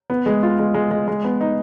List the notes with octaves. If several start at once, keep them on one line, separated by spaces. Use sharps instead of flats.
B3
G#3
F4
G#3
G#3
G#3
G#3
B3
D#4